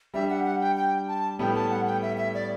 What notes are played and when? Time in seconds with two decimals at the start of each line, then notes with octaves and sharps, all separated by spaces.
0.14 G3 D4 G4 E5
0.30 F#5
0.45 F#5
0.61 G5
0.77 G5
1.08 A5
1.39 A2 G3 B3 G5
1.56 A5
1.71 F#5
1.87 G5
2.02 E5
2.18 E5
2.34 D5